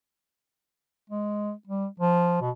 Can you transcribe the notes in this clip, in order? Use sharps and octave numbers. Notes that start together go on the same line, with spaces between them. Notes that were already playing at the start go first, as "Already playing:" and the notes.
G#3
G3
F3
B2